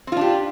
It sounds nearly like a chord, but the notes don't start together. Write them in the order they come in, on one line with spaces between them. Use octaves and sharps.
C4 F4 D4 G4